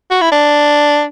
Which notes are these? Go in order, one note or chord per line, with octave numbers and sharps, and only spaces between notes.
F#4
E4
D4